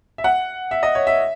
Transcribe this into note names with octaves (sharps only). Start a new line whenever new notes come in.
E5
F#5
E5
D#5
C#5
E5